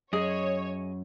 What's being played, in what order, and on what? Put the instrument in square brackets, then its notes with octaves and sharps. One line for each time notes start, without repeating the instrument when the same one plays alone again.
[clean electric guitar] F#2 [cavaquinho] G#4 D#5 [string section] C#5